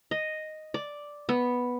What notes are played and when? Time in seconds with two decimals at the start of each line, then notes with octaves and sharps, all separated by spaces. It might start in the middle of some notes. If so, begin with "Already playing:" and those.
0.11 D#5
0.74 D5
1.29 B3